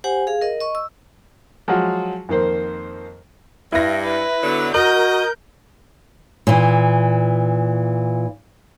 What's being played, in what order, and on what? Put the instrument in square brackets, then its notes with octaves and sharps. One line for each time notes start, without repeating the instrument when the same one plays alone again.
[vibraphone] G4 C5 F#5 G#5
G#4 F5
A#4 D#5
D#5 C#6
E6
[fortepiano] F3 F#3 G#3 F4 F#4
F2 D#3 A#3 C5
[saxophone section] G2 [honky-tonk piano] E4 A#6
[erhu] B4
[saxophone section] D3 F#3 [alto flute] B3
[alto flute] F#4 [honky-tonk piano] A#4 [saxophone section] D#5 [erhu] G6
[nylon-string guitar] A#2 E3